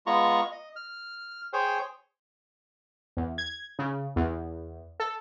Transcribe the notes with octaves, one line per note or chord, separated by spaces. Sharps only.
G#3 B3 F4 A#5 C#6
D#5
F6
G#4 C5 C#5 G5
E2
G#6
C#3
E2
A4